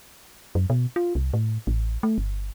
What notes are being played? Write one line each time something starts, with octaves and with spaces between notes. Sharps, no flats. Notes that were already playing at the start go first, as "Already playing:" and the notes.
F#2
B2
F4
C2
A2
A1
A3
G1